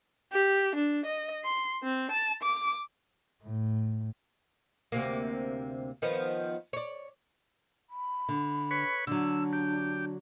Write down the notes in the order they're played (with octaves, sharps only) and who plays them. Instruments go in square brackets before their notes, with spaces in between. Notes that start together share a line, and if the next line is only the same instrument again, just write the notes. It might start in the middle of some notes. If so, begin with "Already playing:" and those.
[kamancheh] G4
D4
D#5
C6
C4
A5
D6
[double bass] A2
[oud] D2 C3 A#3
D#3 F3 B3
C#5 D5
[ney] B5
[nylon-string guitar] D3
[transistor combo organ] B4 C#5
[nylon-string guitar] D3 F#3 [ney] D4 [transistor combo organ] E6
[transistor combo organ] G4